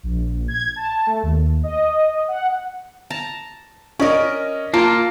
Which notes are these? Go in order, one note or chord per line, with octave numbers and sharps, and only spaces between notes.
A#1
G#6
A5
A3
D#2
D#5
F#5
A5 A#5
C#4 A#4 D5 D#5
A#3 F4 A5